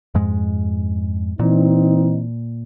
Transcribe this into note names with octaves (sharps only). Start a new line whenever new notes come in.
F2 G#2 G#3
A#2 E3 C4 D#4